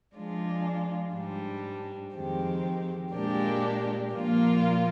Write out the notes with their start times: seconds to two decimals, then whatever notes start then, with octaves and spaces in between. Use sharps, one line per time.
0.15 F3 G#3 D4 F4 G#4
1.15 G#2 G3 D4
2.15 F2 D#3 G#3 C4 G4
3.14 A#2 G#3 D4 G4 A#4
4.14 A#2 F3 A#3 F4 A#4